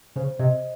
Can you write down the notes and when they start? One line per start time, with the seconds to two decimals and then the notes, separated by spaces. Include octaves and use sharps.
0.16 C#3 C5
0.39 C3 D#5